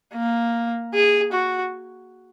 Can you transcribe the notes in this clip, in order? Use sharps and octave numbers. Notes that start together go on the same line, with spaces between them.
A#3
G#4
F#4